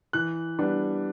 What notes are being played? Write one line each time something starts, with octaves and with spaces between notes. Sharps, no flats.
E3 F#6
G3 B3 D4